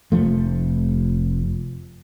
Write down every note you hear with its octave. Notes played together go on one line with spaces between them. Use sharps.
F1 F3 A3